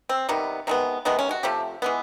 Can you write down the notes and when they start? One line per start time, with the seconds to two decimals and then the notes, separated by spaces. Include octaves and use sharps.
0.09 C4
0.29 C3 D#3 G3 B3
0.67 C3 D#3 G#3 B3
1.05 C3 D#3 G#3 B3
1.19 C#4
1.31 F#4
1.43 C3 F3 A3 G4
1.82 E3 G#3 B3